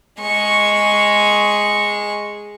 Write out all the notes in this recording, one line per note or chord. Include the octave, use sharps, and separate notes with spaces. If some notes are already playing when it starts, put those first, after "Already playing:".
G#3 C#6